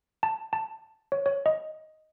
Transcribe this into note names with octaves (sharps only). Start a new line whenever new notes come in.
A5
A5
C#5
C#5
D#5